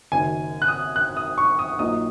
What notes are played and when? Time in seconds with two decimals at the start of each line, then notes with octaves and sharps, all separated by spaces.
0.12 F#1 F#2 D#3 G#5
0.62 F#6
0.68 D#6
0.96 F#6
1.17 D#6
1.38 C#6
1.59 D#6
1.79 A#1 A#2 F#3 A#3 D#4 D#6